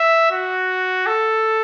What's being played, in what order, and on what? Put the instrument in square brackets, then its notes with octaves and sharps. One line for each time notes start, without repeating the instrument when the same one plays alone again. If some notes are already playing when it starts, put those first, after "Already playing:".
Already playing: [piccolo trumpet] E5
F#4
A4